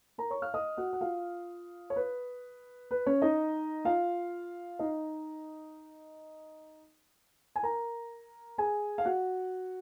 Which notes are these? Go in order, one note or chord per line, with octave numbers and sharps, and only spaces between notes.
A#4 A#5
C#5 C#6
F5 F6
D#5 D#6
F#4 F#5
F#5
F4 F5
C#5
B4
B4
C#4 C#5
D#4 D#5
F4 F5
D#4 D#5
G#5
A#4 A#5
G#4 G#5
F5
F#4 F#5